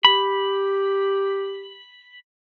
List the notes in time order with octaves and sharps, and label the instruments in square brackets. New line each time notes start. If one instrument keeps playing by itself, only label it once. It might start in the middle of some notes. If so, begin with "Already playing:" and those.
[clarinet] G4 [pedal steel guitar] B5